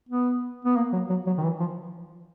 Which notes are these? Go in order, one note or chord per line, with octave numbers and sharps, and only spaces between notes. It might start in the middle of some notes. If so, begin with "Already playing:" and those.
B3
B3
A#3
F#3
F#3
F#3
D#3
E3
F3